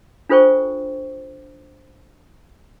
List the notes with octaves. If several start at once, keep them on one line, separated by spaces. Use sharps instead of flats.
D4 F4 A4 C5 G5 C#6